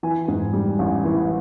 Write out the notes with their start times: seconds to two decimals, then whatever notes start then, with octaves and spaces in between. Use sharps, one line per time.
0.03 E3 G#5
0.28 G#2
0.53 G3
0.79 A1
1.05 E3